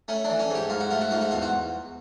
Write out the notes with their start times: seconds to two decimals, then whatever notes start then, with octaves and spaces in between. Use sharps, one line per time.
0.08 A3 C#4
0.24 D4
0.29 E3
0.39 C#4
0.50 G#2
0.55 G4
0.70 G#2 F4
0.80 F#4
0.90 A3 F4
1.01 F#4
1.11 G#2 F4
1.21 F#4
1.31 E2 F4
1.42 F#4